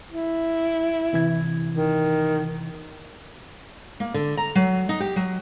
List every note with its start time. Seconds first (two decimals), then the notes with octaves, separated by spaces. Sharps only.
0.12 E4
1.13 C3 E3 G#6
1.73 D#3
4.00 A#3
4.14 D3
4.37 A#5
4.55 F#3
4.89 D#4
5.00 G4
5.16 F#3